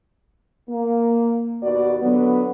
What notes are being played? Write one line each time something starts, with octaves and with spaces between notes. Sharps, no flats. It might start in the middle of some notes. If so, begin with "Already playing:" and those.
A#3
D#2 B2 F#4 D5
D3 F#3 B3